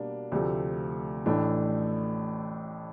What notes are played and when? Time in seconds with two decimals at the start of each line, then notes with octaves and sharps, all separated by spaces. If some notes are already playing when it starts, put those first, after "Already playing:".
Already playing: B2 G3 A#3 D4
0.32 D2 C3 F3 A3
1.26 A1 A2 E3 A3 D4